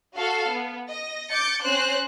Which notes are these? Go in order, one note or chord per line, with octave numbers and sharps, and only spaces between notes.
F#4 A4 F5
B3
D#5 A#6
D6 G6 A6 C#7
C4 C#4 C5 F#6